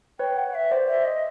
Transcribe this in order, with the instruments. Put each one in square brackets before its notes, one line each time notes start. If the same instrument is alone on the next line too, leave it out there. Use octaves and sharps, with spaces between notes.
[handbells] B4 C#5 [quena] G5
[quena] F#5
E5
[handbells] C5 D5
[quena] E5
D#5